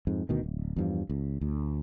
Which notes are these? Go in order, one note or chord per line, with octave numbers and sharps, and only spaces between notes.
F2 G#2
D2 B2 D#3
D1
E2 G2 F3
C#2
D2